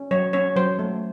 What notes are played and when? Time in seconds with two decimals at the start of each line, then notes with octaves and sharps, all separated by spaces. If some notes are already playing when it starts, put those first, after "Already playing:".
Already playing: C#4
0.11 F#3 C#5
0.33 C#4 C#5
0.56 F#3 C5
0.79 A3